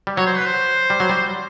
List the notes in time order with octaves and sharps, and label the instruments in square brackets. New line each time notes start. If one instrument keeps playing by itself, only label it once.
[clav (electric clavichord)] G3
[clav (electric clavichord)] F#3 [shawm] C#5
[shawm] C5
B4
C5
[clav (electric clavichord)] G3
F#3
G3